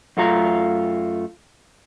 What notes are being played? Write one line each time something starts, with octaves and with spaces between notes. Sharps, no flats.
F#2 A3 F4 A#5